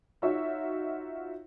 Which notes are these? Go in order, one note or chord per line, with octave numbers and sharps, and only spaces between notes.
D#4 F4 F#4 C#5 E5